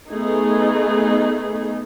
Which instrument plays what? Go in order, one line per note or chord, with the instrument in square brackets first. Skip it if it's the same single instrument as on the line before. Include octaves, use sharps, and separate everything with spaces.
[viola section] A3 B3 D#4 G#4